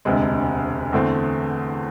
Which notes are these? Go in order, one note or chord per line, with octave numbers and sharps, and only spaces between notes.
E1 D2 C3 G#3
E2 D3 A3 C4